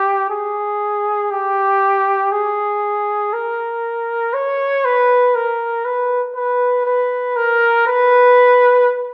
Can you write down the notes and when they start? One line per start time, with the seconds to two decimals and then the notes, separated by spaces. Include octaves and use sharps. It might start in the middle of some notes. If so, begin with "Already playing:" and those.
Already playing: G4
0.30 G#4
1.31 G4
2.32 G#4
3.33 A#4
4.34 C#5
4.85 B4
5.35 A#4
5.85 B4
6.35 B4
6.86 B4
7.36 A#4
7.87 B4